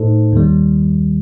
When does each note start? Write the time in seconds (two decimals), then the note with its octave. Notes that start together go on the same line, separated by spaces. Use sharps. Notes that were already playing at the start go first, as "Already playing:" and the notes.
Already playing: A2 A3 D#4 A4 C5
0.33 D#2 D#3 G3